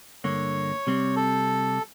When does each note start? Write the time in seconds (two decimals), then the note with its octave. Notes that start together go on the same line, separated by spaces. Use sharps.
0.24 G2 D3 A#3 C#5
0.87 C3 G3 C4
1.16 A4